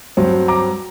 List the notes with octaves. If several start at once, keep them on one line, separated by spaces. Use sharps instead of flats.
G2 F#3 C4
A#5 D6